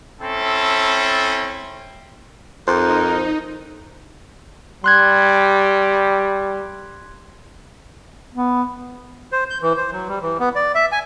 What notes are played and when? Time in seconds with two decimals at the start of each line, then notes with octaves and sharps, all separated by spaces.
0.21 C4 C#4 E4 A4
2.68 F2 D#4 A#4 C5
4.84 G3 C6 F#6 G#6
8.35 B3
9.32 C5
9.50 G6
9.62 E3
9.77 C5
9.93 F#3
10.08 G3
10.22 E3
10.40 B3
10.56 D5
10.75 E5
10.92 G#5